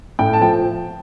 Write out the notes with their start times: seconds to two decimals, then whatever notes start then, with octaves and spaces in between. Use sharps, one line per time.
0.19 A2 G5
0.33 A5
0.41 F3 G5